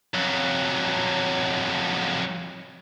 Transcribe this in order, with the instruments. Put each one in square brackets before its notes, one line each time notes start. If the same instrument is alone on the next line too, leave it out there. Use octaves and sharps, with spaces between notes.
[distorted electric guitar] F2 F#3